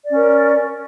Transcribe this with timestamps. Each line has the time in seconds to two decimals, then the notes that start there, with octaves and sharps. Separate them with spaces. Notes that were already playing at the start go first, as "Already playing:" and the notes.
0.05 D5
0.09 C#4
0.14 A#4